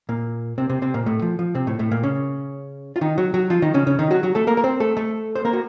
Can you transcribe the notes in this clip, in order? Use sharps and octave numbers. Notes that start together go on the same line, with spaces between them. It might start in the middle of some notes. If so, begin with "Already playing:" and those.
A#2 A#3
C3 C4
C3 C4
C3 C4
A#2 A#3
A2 A3
F3
F3
C3 C4
A2 A3
A2 A3
A#2 A#3
C#3 C#4
F4
D#3 D#4
F#3 F#4
F#3 F#4
F3 F4
D#3 D#4
C#3 C#4
C#3 C#4
D#3 D#4
F#3 F#4
F#3 F#4
A3 A4
A#3 A#4
A#4
C4 C5
A3 A4
A3 A4
C5
A#3 A#4
F#4